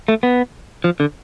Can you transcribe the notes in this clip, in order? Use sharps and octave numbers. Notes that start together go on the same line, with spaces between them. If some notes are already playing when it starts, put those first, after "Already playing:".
A3
B3
F3
D3